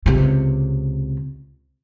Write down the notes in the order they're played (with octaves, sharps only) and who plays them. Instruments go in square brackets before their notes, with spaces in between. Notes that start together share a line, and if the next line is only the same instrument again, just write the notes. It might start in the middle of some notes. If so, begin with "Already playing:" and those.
[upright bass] C#2 C3